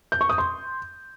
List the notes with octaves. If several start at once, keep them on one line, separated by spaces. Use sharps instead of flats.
G6
C#6
D#6
C6